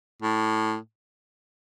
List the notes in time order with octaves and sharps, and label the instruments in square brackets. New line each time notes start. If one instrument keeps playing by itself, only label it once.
[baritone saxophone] A2